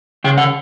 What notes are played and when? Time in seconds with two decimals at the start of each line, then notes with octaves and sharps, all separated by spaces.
0.24 C#3 G5
0.38 F#5